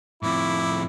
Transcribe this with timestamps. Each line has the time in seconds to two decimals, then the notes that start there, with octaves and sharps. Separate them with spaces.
0.23 F2 A2 E4 D6